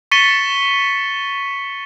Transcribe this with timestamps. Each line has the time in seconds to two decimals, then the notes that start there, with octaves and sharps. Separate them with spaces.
0.11 C#6 A6 B6 C#7 D#7 G7